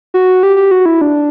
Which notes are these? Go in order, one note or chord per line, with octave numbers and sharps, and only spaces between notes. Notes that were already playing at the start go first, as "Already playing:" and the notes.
F#4
G4
G4
F#4
E4
D4